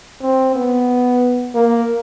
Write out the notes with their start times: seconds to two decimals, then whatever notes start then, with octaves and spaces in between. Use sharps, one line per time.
0.22 C4
0.56 B3
1.55 A#3